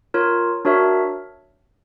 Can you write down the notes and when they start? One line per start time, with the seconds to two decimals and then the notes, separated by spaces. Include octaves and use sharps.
0.14 F4 A#4 C#5
0.65 D4 F#4 A#4 C#5 E5